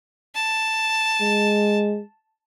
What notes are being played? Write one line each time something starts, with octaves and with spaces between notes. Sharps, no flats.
A5
G#3